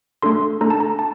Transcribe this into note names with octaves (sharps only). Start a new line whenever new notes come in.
A3 D4 A4 C6
A3 D4 A4 A#5
A5
A#5
A5